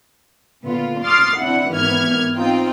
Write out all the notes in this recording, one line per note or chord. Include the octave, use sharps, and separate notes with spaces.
A#2 D3 B3 F4
C6 D6 D#6 F6 A6 C7
C4 D4 E4 F#5
G#1 G#2 E3 B3 F6 G#6
C4 D#4 F4 G5